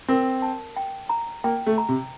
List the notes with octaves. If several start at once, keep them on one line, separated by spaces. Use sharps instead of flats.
C4 A#4
A5
G5
A#5
A#3 G5
A3
A#5
C3